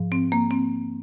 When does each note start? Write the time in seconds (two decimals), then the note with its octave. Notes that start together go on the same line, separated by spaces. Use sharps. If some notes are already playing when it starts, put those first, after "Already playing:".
Already playing: G#2 F3
0.12 C4
0.32 A#3
0.51 C4